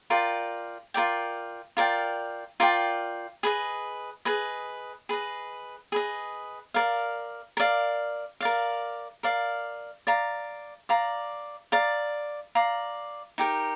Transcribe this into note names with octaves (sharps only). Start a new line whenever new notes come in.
F4 A#4 D5 G5
F4 A#4 D5 G5
F4 A#4 D5 G5
F4 A#4 D5 G5
G#4 B4 D#5
G#4 B4 D#5
G#4 B4 D#5
G#4 B4 D#5
A#4 D5 F5
A#4 D5 F5
A#4 D5 F5
A#4 D5 F5
D5 F5 A#5
D5 F5 A#5
D5 F5 A#5
D5 F5 A#5
D#4 G4 A#4